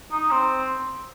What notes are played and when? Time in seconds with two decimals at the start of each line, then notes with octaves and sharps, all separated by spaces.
0.12 D#4
0.31 C4